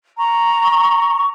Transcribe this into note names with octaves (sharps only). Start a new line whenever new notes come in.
A#5 C#6